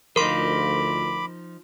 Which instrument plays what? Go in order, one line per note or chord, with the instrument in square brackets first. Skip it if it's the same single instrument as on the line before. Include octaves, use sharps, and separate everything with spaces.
[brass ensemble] D2 F4 [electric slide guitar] F3 D#4 [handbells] A#4 C6 [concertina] B5 D6